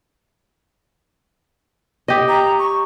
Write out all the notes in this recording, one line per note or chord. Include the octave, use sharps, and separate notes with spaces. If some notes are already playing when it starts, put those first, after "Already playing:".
G4 D#5
A#5
C#6